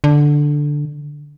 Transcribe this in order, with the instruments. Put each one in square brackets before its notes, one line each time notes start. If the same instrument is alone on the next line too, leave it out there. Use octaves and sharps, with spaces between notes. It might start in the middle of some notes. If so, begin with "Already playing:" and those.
[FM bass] D3